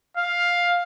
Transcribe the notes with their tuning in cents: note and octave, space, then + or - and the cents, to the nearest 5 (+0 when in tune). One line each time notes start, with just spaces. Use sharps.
F5 +10